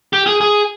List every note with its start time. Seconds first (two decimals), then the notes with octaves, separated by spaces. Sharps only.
0.13 G4
0.27 G#4
0.41 G#4